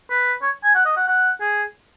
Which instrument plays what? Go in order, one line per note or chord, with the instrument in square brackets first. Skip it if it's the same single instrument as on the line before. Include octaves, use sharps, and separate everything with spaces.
[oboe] B4
C#5
G#5
F#5
D#5
F#5
F#5
G#4